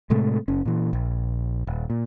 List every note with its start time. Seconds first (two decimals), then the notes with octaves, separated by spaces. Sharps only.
0.10 A2 C3 G#3 A3
0.48 F#1 C#4
0.65 A#2 E3
0.93 A#1
1.67 D#1
1.90 A#2